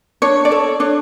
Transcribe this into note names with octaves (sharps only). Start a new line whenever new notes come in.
D4 C#5
D5
A4 C#5
D4 C#5